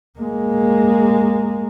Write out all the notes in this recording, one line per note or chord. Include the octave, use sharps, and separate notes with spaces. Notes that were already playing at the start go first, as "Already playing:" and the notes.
G#3 A#3